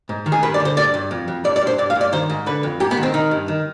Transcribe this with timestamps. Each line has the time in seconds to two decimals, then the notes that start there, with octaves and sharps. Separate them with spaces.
0.09 G#2
0.26 D#3
0.32 G#4
0.43 G2 B4
0.54 D5
0.60 D3
0.65 C5
0.77 G2 D5
0.94 G2
1.11 F2
1.28 F2
1.44 G2 D5
1.56 D5
1.61 G2
1.67 C5
1.78 G2 D5
1.90 F5
1.95 G2
2.01 D5
2.12 D#3 C5
2.30 G#2
2.46 D3 B4
2.63 F2
2.80 G#2 G4
2.91 B3
2.97 D#3
3.03 C4
3.14 D#3 D#4
3.31 G2
3.48 D#3